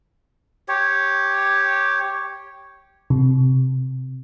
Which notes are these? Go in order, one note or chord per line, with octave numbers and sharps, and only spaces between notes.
G4 C#5
C3